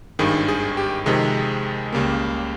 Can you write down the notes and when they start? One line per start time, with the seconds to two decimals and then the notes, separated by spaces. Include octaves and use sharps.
0.19 G#1 G2 D#3 G#4
0.48 G#4
0.77 G4
1.06 F2 C3 D#3 G#3 G#4
1.93 C#2 C#3 G3 A#3